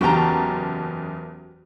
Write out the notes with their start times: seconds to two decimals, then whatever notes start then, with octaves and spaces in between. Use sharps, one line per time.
0.01 F#1 E2 F#4 G4 A5 A#5